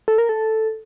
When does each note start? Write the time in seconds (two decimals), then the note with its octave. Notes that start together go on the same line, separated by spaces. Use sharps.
0.08 A4
0.18 A#4
0.29 A4